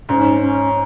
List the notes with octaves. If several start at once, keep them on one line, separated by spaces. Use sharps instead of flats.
G#2 C#4
C#4